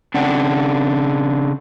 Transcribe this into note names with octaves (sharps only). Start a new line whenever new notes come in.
C#3 C4 D4 F#5